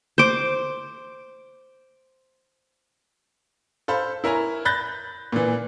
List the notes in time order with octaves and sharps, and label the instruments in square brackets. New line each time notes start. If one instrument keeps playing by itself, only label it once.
[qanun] C5 D6
[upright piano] A4 C5 F5 B5
E4 A#4 C#5 G#5 A#5
B5 F#6 G6 A6 A#6
A#2 E3